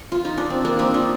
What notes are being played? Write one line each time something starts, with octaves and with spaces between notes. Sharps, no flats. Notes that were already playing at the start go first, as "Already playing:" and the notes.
Already playing: G4
F4
D#4
D4
C4
A#3 D4
C4 D#4
D4 F4